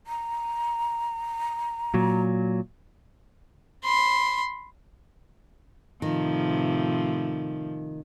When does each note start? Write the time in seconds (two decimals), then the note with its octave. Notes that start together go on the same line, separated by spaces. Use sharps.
0.07 A#5
1.94 A#2 F#3
3.84 B5 C6
6.02 A2 C3 D#3 F3